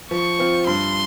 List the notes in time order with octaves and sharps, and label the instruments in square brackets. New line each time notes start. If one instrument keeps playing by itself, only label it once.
[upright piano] F3 [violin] C#6
[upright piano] C4 F4
[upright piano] G2 [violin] C6